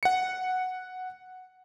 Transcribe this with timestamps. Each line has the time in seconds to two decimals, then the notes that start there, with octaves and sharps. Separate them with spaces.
0.03 F#5 C#7